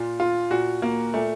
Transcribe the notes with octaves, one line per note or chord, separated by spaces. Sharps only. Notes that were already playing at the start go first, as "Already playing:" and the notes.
Already playing: A#2 F4
F4
A#2 F#4
A#3
A#2 A3